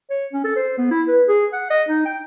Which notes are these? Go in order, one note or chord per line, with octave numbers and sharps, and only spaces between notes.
C#5
C#4
A4
C5
B3
E4
B4
G#4
F#5
D#5
D#4
G5